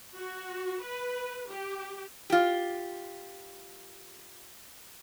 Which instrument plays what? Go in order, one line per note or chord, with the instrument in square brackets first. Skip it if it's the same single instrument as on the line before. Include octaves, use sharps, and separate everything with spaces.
[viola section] F#4
B4
G4
[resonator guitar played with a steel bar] F4 G4